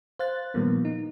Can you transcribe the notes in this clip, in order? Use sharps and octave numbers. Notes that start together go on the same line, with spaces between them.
C5 F5 F#6 A6
A#2 D#3 F3 G3 A#3 B3
D#4